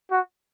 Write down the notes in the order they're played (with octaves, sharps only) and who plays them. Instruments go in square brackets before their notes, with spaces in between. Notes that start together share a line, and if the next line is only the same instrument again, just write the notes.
[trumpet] F#4